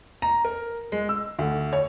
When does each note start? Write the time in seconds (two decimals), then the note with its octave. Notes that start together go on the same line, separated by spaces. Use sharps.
0.22 A#5
0.45 A#4
0.92 G#3
1.09 E6
1.39 D2
1.73 C#5